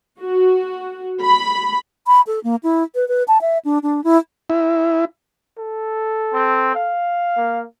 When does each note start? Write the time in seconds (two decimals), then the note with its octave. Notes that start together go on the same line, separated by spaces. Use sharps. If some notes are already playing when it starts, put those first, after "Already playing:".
0.20 F#4
1.23 B5
2.07 B5
2.27 A4
2.44 A#3
2.63 E4
2.95 B4
3.08 B4
3.28 A5
3.41 E5
3.65 D4
3.83 D4
4.04 E4
4.50 E4
5.58 A4
6.34 C4
6.75 F5
7.37 A#3